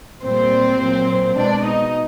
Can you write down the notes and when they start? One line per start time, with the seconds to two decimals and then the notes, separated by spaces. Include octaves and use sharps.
0.24 A#2 G3 C4 C5
0.80 A#2 F#3
1.38 B2 G#3 D4 D5
1.66 D#4 D#5